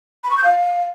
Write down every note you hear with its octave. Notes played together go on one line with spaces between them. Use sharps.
B5
C#6
G6
F5